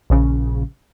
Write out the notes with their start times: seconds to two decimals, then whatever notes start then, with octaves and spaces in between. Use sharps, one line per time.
0.10 A#1 C#3